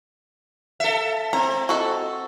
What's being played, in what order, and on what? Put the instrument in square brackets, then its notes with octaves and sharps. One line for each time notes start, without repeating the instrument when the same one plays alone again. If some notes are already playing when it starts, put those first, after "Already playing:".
[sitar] A4 E5
[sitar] C4 [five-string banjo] A#5
[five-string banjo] F#4 A4 D#5